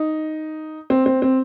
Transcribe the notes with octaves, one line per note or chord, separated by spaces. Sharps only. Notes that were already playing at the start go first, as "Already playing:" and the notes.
Already playing: D#4
C4
C4
C4